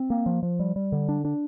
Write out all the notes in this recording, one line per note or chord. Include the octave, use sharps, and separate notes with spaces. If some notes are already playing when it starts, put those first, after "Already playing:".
Already playing: C4
A#3
F3
F3
G3
G3
D3
D4
D4